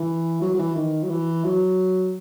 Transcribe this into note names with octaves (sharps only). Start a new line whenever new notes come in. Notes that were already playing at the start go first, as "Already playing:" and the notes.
Already playing: E3
F#3
F#3
E3
D#3
F#3
E3
F#3